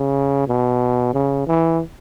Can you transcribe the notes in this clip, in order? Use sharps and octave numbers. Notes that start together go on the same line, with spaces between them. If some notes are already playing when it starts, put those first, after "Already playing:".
Already playing: C#3
B2
C#3
E3